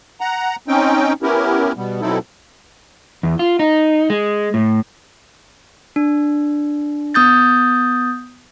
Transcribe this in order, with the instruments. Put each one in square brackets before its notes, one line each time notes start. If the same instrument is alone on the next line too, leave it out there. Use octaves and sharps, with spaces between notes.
[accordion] F#5 A#5
C4 C#4 D#4 G5
B3 C#4 E4 G4 A#4
B2 G3 B3
B2 F#3 C4 D#4 E4 A4
[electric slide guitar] E2
F4
D#4
G#3
A2
[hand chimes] D4
B3 D#6 G6 A6